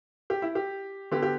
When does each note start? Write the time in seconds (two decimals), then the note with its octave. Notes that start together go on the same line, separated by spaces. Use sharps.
0.30 G4
0.42 E4
0.55 G4
1.11 D3 B3 G4
1.23 G4